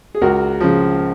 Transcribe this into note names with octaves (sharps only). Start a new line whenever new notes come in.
G#4
C#2 F#4 A#4
C#3 F3